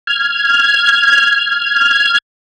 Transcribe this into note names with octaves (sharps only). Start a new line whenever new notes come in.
F6 G#6